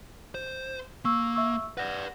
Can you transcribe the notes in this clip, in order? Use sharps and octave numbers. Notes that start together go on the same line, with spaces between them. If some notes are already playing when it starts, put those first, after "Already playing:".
C5
A#3 C#6 E6
E5 C#6 E6
B4 D5 F#5 A#6